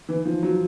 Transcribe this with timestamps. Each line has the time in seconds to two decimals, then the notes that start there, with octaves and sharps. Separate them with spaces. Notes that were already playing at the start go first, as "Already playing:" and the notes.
0.09 E3
0.25 F3
0.43 F#3